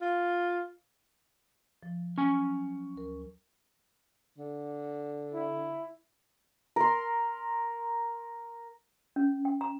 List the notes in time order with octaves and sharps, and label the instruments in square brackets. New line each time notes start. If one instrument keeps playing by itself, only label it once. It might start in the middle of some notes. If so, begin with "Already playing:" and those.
[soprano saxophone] F4
[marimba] F3
[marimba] F#3 [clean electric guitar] C#4 G#5
[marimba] D2 A#4
[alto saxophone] D3
[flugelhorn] E4
[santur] A#4 C6
[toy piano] C#4
G5
A#5